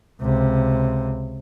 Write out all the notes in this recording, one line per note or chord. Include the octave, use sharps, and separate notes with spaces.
C#2 C3